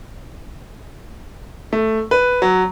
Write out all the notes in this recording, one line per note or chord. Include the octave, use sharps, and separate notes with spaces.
A3
B4
F#3